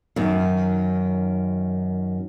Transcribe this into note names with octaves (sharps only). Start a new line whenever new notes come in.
F#2 D#3